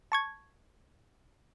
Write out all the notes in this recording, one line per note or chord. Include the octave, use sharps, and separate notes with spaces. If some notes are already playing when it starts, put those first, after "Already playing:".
A5 C#6 G#6